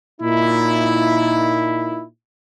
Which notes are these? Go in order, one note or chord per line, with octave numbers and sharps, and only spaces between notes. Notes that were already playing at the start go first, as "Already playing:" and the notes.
A#2 D#4 E4